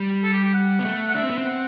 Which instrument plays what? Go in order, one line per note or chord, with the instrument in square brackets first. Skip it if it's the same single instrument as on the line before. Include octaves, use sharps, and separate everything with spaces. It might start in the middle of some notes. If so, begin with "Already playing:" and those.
Already playing: [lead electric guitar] G3
[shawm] A4
G4
G4
F#5
[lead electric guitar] B3
A3
[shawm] F#5
[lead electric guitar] D4 [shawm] E5
[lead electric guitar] C4
B3
C4
[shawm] F#5